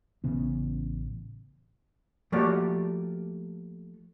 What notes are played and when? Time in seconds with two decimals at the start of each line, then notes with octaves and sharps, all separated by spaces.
0.24 A1 C#3 B3
2.32 F3 A3 A#3 F#4 G4 D5